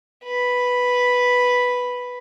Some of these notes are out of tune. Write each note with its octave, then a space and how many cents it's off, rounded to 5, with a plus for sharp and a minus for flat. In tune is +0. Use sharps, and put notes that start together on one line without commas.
B4 +0